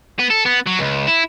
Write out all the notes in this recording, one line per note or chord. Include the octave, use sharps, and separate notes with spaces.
B3
A4
B3
F#3
C#2
E4